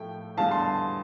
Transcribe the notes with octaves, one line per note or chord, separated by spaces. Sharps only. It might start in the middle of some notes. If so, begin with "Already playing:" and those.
Already playing: A2 F3 A3 G5
E2 D3 G3 F5 A5
A5 C6